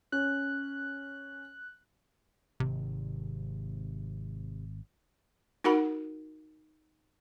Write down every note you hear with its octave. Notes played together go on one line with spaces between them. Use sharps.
C#4 F#6
G#1 C3
D#4 F#4 A#4 F#5 B5